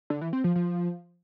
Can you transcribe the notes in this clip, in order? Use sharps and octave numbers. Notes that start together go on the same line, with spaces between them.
D3
E3
C4
F3
F3